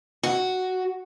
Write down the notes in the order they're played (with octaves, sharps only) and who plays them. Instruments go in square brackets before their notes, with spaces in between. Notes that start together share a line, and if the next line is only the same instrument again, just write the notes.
[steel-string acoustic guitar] F#4